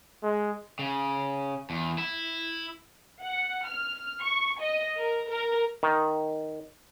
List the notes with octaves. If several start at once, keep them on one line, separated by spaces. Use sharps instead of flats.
G#3
C#3
E2
E4
F#5
F6
C#6
D#5
A#4
A#4
D#3